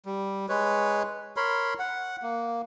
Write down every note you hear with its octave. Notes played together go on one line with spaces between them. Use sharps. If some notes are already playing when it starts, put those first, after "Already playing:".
G3
G#3 B4 C#5
A#4 C#5 B5 C6
F#5
A#3